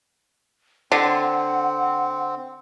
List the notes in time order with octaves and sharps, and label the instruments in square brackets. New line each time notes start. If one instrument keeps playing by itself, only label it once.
[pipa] D3 [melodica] C4 [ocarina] F#5